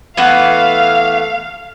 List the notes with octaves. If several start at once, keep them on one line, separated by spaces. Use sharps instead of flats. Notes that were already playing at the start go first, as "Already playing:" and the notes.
E3 A3 B3 F5